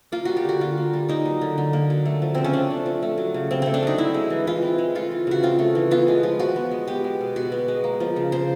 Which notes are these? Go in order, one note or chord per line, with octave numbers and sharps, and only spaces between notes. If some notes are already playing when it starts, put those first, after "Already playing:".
A#3 F4
G3 F#4
G4
D3 F#4
D3 F4
A#3
G3
A#3 D#4
F#3
D3
D3
A#3
F#3
A3
F3
C#3 C4
C#4
C4 D4
A3
F3
A3
F#3
C#3
C#3 C4
A3 C4
D4
F#3 D#4
C4 E4
G#3
E3
E3 F4
C4
G#3
A3 F4
E3
C#3 F#4
C4 F4
A3
E3
B3 F4
G#3
F3
F3 F#4
B3
G#3
B3 G4
G#3
B2
B2 F#4
B3
G#3
A#3
F3
C#3
C#3 C5